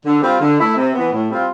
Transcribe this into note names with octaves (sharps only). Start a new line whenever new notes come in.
D3
G3 C4 F4
D3
A3 E4
C3
E3 B3
A2
G3 C4 F4